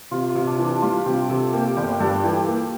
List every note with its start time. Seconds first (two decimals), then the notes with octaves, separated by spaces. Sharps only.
0.11 C3 F4
0.30 F4
0.35 C3
0.47 D4
0.59 E3
0.65 D4
0.82 G3 F4
1.06 C3 G4
1.29 C3 A4
1.53 A#3 G4
1.77 G1 G4
2.00 G2 A4
2.24 E3 G4
2.47 A#3